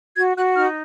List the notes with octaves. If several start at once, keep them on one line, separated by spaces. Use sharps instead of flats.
F#4 G#6
F#4 F#6
D#4 F6